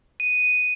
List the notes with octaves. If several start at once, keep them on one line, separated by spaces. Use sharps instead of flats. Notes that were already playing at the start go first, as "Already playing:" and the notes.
D#7